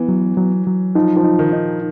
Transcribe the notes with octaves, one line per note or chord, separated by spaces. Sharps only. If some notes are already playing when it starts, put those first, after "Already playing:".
Already playing: E3 B3
F#3
F#3
F#3
F3 D#4
F3
D#4
D#3
D#4